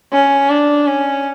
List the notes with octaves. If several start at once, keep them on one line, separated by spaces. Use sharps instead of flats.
C#4
D4
C#4